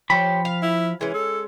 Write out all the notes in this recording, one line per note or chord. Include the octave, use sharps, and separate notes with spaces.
F3 G4 C5 C#5 B5
F5
E4
E3 G#3 C#4
A4